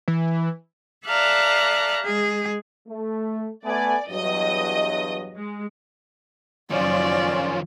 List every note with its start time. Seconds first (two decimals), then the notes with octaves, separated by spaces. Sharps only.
0.08 E3
1.06 A4 D5 E5 F5 A#5 F#6
2.03 G#3 G#4
2.88 A3
3.65 A3 B3 D5 G#5
4.10 E2 G2 F#3 D#5
5.35 G#3
6.71 F#1 D#3 F3 F#3 C#4 F4 D5